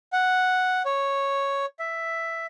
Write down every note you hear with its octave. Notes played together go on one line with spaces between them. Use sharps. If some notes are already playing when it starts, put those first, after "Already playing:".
F#5
C#5
E5